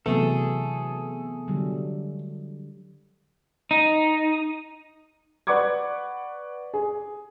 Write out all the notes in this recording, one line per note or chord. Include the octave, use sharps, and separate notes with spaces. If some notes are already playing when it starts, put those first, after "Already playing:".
C3 E3 F#3 A3 B3 G#4 A4
D3 F#3 G3
D#4
B4 D5 F#5 C#6 D6 G#6
G#4